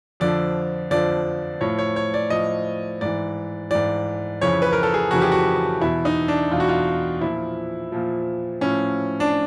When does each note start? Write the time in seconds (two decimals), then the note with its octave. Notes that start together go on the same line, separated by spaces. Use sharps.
0.20 F2 D3 F3 D5
0.91 F2 D3 F3 D5
1.61 A2 F3 C#5
1.78 C#5
1.96 C#5
2.14 D5
2.30 A2 F3 D#5
3.01 G#2 E3 D5
3.71 G#2 E3 D5
4.41 F2 C#3 E3 C#5
4.62 B4
4.73 A#4
4.83 A4
4.94 G#4
5.11 F2 C#3 E3 F#4
5.21 G4
5.32 F#4
5.81 E2 B2 E4
6.05 D#4
6.28 D4
6.51 E2 B2 F4
6.60 F#4
6.68 F4
7.21 A#2 F3 E4
7.92 A#2 F3
8.61 A2 F3 C#4
9.20 D4